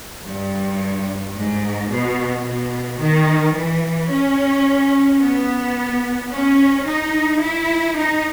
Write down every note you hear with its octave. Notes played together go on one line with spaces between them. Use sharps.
G2
G#2
B2
B2
D#3
E3
C#4
B3
C#4
D#4
E4
D#4